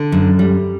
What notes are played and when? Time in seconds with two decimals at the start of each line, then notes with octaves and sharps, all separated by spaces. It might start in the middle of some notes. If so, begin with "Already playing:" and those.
Already playing: D3
0.12 F#2
0.39 G3